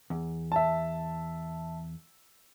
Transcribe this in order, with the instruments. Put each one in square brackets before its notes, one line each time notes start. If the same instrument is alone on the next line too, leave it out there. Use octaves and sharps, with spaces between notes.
[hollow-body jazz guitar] E2
[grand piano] E5 A5